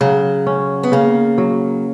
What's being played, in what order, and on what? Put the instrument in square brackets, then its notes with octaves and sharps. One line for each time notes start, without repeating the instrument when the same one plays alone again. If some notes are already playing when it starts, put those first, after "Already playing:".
[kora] C#3 [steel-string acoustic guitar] F#3
[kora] C#4
[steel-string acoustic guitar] B3
[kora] C#3 [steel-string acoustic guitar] A#3
[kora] F#3